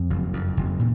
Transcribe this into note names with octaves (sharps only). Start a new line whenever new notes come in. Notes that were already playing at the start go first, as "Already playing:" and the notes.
Already playing: F2
F#1
F2
F#1
A#2